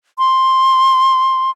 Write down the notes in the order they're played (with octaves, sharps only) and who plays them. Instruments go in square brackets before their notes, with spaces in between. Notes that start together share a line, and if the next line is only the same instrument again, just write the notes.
[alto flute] C6